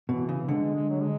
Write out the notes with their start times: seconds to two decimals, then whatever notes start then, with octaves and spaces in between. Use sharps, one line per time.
0.09 B2 E3
0.29 C#3
0.48 D3 G#3
0.75 G#3
0.90 F#3
1.02 G#3